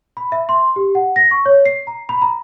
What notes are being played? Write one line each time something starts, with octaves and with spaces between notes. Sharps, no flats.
B5
E5
C6
G4
F#5
A#6
C#6
C#5
C7
A#5
B5
A#5